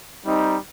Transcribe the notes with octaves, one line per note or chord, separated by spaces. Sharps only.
G3 C4 D#4